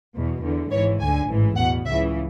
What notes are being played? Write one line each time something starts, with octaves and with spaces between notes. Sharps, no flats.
E2 B2
E2 D3
G#1 G#2 E3 C#5
D2 D3 G#5
A1 G#2 E3
E2 B2 F#5
C#2 C#3 E3 E5